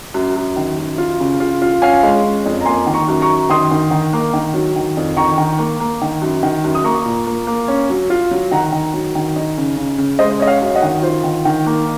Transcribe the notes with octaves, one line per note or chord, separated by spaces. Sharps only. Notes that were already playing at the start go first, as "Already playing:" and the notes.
F#2
F#2
D#3
F#2
F4
C#3
F4
F4
C#4 F5 G#5
G#3
C#4
F2
A#5
A#3 G#5 C6
D#3
A#5 C#6
F#2
A#5 C#6
F#2
D#3 C6 D#6
D#3
D#3
A#3
D#3
F#3
D#3
F2
D#3 A#5 C#6
D#3
A#3
A#3
D#3
F#2
D#3
F#2
D#6
A#3 A#5 C#6
A#2
A#3
A#3
C#4
F#3
F4
F#3
D#3 F#5 A#5
D#3
F#3
D#3
D#4
C#3
C#3
C#3
G#3 C5 D#5
C#4 D#5
C#5 F5
F#2
D#5 F#5
D#3
F4 C5
D#3
D#3
A#3